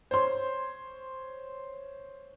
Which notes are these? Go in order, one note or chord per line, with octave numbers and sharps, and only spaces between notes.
C5 C#5 C6